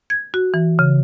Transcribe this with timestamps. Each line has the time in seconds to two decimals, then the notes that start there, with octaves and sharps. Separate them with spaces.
0.10 G#6
0.34 F#4
0.54 E3
0.79 C#3